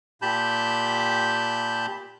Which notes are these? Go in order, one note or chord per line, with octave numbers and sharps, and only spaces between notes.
A#2 G4 A5 B5 G6